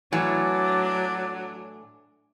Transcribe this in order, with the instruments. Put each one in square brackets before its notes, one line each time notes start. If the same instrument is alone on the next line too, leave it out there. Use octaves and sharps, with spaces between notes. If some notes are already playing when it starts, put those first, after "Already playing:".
[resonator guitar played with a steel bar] A2 E3 G#5 [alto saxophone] F#3 [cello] D4